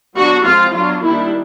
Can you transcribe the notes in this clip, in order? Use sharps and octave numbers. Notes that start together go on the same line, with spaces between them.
F#3 B3 D4 F#4
F3 G#3 C4 F4
F#3 B3 D4 F4
D#3 G3 A#3 D4 E4